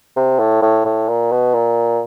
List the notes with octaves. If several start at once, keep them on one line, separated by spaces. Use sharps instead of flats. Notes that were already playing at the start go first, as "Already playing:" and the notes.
C3
A2
A2
A2
A#2
B2
A#2